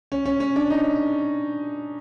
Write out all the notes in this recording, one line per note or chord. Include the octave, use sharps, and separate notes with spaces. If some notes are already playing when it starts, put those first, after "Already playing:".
C#4
C#4
C#4
D4
D#4